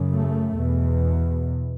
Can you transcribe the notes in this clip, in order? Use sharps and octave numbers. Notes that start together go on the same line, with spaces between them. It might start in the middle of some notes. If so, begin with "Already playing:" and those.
Already playing: F#2 C#3
A3
E2 B2